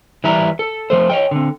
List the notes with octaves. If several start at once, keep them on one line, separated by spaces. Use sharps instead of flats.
E3 G3 E4 A#5
A4
F3 A3 C5
C#5 D#5 G5
D3 C4